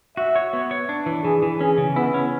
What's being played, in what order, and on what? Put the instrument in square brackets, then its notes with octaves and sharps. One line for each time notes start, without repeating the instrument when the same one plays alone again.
[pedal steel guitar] F#4 [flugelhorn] E5
[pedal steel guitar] C#5
B3
C#5
D4
E3
[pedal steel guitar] E3 [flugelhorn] G#4
[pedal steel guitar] E3
[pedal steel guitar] C#4 [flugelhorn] G#4
[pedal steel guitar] C#3
[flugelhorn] B3 [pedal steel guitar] E4
[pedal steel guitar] C#4